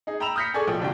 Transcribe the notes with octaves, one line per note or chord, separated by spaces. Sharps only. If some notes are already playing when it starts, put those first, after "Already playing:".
D#4 G#4
G5 A#5 B5 E6 E7 F7
D#6 F6 G6 A#6 B6 C#7
G#4 A4 D5 G#5 C#6
B1 F3 G5
G1 C2 D4 G5